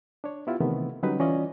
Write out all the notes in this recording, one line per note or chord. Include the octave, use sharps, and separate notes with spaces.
D4 C#5
B3 E4 F4 G4
C3 D#3 E3 A3 B3
D3 F#3 G3 C#4 D#4 B4
E3 C#4 F4 D5 D#5